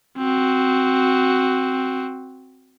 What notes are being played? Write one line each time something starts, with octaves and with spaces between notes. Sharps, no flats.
C4 F#4